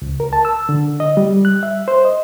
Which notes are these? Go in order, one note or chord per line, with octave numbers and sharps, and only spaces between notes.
C#2
A#4
A5
E6
D3
D#5
G3
F#6
E5
C5
D#5